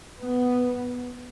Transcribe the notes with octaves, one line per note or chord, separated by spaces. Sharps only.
B3